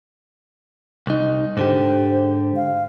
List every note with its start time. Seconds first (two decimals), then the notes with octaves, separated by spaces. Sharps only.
1.07 C2 D#4
1.57 G#2 D3 G4 C5
2.56 F5